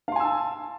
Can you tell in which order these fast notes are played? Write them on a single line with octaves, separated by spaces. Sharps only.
F5 C6 G#5 E6 A5